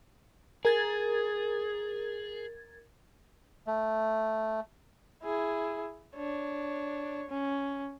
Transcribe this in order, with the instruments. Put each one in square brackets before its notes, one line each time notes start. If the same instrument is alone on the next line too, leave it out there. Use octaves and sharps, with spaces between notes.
[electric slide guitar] G#4 [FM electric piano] A#4 G#6 A6
[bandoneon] A3
[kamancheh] E4 G#4
D4 C#5
C#4